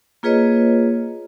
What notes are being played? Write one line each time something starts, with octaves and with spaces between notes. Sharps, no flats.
A#3 F4 G#4 B4 C#5 D#5